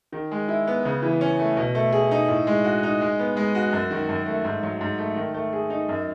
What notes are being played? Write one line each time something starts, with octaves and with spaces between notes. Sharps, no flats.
D#3
G#3
E4
B3
C#3
E3
C#4
A3
B2
A3
G#4
D#4
A2
G#3
F#4
D#4
G#3
B3
G#3
F#4
F#2
D#3
F#2
A3
G#2
F#3
G#2
A3
D#3
A3
G#4
D#4
F#2